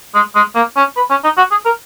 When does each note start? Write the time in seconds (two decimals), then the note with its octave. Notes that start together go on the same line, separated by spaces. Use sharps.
0.15 G#3
0.35 G#3
0.55 A#3
0.77 C#4
0.96 B4
1.10 C#4
1.24 D#4
1.37 F#4
1.51 G#4
1.65 A#4